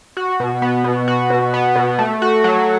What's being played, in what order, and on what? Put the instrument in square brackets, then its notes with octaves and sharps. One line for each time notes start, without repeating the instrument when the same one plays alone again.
[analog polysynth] F#4
B2
B3
B2
F#4
B2
B3
B2
A3
F#4
F#3